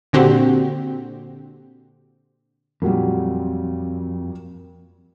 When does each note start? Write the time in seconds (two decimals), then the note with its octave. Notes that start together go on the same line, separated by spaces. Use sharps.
0.13 A#2 D3 C4 F#4 G4
2.82 F2 A#2 F#3 G3